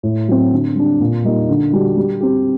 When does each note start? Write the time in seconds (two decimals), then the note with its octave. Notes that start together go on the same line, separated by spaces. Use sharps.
0.03 A2
0.28 F#3 C4
0.52 D3
0.76 G3 D4
1.00 A#2
1.24 G3 A#3 D#4 G4
1.49 D3
1.73 G3 D4 F#4
1.97 G3
2.20 C4 G4